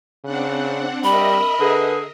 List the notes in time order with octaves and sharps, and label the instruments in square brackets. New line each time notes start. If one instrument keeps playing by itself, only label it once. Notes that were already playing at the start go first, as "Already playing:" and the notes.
[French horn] C#3 [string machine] C4 D4 F#5
[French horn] G3 [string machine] A#4 D#5 E5 [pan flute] B5
[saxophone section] D3 G#4 [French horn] B4